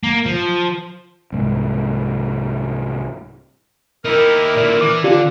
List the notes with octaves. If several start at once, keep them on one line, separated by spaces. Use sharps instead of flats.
A#3
F3
C2 G#2
D#4 E4 G4 A#4
A#2 D3 D5
E3 D6
D3 F4 G4 D5